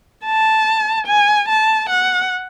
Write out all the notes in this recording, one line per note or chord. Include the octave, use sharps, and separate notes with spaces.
A5
G#5
A5
F#5